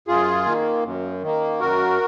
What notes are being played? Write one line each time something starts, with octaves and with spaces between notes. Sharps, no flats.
F#2 F4 G#4
D#3 A#3
F#2
D#3 A#3
F#2 F#4 A#4